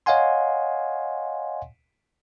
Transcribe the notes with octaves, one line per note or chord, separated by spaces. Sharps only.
C#5 D#5 F5 F#5 G#5 C6